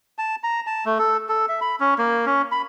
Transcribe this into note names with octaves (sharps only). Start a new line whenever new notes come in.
A5
A#5
A5
A3
A4
A4
E5
B5
C#4
A#3
C#4
B5